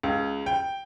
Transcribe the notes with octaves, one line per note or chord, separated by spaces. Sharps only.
C#2
G5